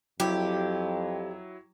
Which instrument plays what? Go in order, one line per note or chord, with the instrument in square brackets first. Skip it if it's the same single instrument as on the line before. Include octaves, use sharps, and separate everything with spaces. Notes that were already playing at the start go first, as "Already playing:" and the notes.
[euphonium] F2 [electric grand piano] F#3 E4 [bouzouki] G4